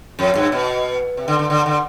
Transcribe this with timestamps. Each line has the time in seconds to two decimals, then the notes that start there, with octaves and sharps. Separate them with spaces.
0.19 F2
0.35 G2
0.52 B2
1.17 C3
1.28 D3
1.39 D3
1.50 D3
1.66 D3